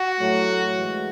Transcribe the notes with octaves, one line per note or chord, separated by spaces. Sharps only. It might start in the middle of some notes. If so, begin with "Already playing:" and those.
Already playing: F#4
A2 F#3 A3
A2 E3 G#3